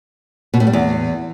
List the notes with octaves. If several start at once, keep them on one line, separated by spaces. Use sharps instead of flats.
B2
A2
G3
E2